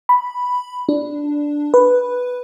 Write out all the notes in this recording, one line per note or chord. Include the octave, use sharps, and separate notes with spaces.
B5
D4
B4